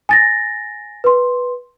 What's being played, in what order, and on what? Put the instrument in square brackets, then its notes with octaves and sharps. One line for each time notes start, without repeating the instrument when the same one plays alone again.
[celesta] G#5 A6 A#6
B4 C6